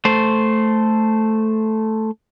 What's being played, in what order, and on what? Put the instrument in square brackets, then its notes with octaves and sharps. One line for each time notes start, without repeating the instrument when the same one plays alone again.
[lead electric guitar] A3 C5